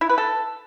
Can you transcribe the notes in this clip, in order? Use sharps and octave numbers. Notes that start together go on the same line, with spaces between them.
E4
B4
A4